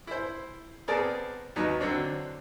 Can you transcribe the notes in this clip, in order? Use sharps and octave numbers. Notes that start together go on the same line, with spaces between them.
E4 C5
B3 C4 G#4 A#4 D5 A5
D#2 F#3 D#4 B4
D3 F#3 C4 D4